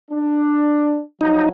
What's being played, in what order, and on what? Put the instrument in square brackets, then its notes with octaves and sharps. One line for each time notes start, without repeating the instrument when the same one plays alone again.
[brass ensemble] D4
[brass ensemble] F3 F#3 [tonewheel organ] D#4